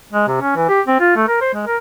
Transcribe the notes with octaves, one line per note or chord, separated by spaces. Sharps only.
G#3
C3
C#4
E3
G4
C4
F4
A3
A#4
C5
G#3
A#4